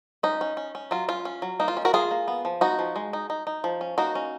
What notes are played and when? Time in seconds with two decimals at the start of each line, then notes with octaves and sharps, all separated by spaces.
0.23 C#4 D#4
0.41 C#4
0.57 C#4
0.75 C#4
0.91 F#3 F4
1.08 C#4 F4
1.25 C#4
1.42 F#3
1.60 A#3 D#4
1.68 F4
1.77 C#4
1.85 F#4 A#4
1.93 A#3 F4 G#4
2.11 A#3
2.28 B3
2.45 F3
2.61 B3 D#4 F#4
2.79 F3
2.96 G#3
3.13 D#4
3.30 D#4
3.47 D#4
3.64 F3
3.81 C#4
3.98 A#3 D#4 F#4
4.15 C#4